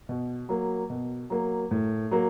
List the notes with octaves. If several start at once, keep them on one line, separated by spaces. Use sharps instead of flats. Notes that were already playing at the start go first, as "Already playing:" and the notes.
B2
F#3 A#3
B2
F#3 A#3
A2
F#3 A#3